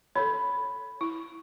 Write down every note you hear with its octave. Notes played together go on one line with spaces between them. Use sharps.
A4 C#5 B5
E4